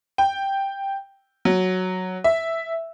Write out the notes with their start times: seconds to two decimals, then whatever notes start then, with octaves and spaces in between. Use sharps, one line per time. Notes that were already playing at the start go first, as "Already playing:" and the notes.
0.18 G5
1.45 F#3
2.24 E5